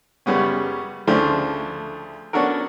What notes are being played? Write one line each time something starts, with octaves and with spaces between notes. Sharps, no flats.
F#2 C#3 G3 B3 C#4
D2 C#3 F3 A3 D4
B3 C#4 D4 F#4 A4 A#4